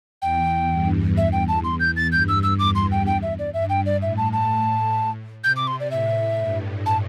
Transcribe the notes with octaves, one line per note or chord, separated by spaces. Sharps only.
E2 G5
G2
E2 E5
G5
A5
C6
G6
A6
G2 G6
E6
E6
E2 D6
C6
G5
G5
E5
D5
G2 E5
G5
D5
A2 E5
A5
A5
C3 G6
D6
C6
D5
A2 E5
G2
A5